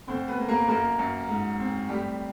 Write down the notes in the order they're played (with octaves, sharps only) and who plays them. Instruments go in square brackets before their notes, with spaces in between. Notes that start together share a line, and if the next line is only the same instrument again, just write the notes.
[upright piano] D2 C4 C5
B3 B4
A#3
A#3 A#4
F#2 A#3 A#4
F#2
G#2
C4
A2 G3 G4